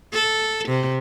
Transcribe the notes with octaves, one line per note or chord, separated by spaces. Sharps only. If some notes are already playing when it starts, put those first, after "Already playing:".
A4
C3